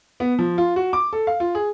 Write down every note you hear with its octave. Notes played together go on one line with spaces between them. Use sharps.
B3
F3
F4
F#4
D6
A4
F5
F4
G#4